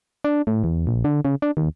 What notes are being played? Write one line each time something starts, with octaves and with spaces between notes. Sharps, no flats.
D4
A2
E2
A#1
D3
C#3
D4
D#2